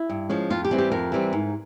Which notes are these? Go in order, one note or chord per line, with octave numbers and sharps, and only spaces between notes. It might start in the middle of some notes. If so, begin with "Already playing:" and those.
Already playing: E4
G2
F3 G#3 C#4
F2 F4
G4
E3 G3 C4
G4
F2 A#4
E3 G3 C4
G#2